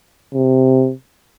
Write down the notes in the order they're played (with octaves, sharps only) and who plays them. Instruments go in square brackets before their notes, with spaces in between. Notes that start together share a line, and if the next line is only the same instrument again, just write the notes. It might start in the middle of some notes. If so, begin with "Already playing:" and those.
[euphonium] C3